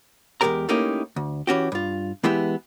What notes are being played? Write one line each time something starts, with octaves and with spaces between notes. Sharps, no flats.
E2 G2 G#3 G4 A#4 A#5
A3 A#3 C#4 D#4 E4 G4
D2
E3 C#4 F#4 G4
G2 F4
E3 G#3 B3 E4 G4 E5